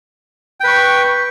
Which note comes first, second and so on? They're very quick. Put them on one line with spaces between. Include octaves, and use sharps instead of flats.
G5 B4 C#6